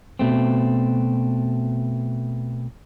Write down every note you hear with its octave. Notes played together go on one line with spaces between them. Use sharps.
B2 A3 C4